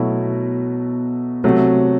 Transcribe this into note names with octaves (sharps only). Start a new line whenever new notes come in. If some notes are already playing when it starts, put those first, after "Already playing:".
Already playing: B2 F#3 A3 E4
C3 F#3 A3